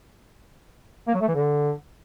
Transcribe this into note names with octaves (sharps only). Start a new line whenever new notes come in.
A#3
F#3
A3
E3
D3